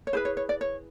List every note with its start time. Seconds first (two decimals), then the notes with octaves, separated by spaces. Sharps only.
0.07 C#5
0.13 E4 G#4 B4 C5
0.25 C#5
0.37 C#5
0.49 D5
0.61 C#5